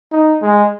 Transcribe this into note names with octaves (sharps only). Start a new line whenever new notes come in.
D#4
G#3